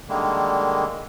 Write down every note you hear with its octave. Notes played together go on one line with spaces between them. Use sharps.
D3 D#3 G3 G#3 A#3